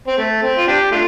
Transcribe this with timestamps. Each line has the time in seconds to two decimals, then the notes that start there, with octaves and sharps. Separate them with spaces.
0.07 C4
0.18 A3
0.43 C4
0.57 F4
0.68 D4 G4
0.92 A3 D4 F4